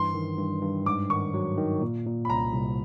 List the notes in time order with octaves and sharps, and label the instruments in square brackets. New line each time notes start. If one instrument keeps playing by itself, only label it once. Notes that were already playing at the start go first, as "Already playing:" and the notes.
Already playing: [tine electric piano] G2 E3 [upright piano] C6
[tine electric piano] D#3
G2
G2
[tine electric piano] G#2 [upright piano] D6
[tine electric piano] D#3 [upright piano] C#6
[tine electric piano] F#3
D#3
A#2
A#2
[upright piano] B5
[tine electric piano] C2 [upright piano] A#5
[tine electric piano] C2